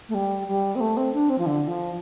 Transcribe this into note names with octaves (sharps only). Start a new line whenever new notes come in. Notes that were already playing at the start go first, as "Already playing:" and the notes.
A3
G3
G3
C4
A3
C4
D4
C4
F3
D3
F3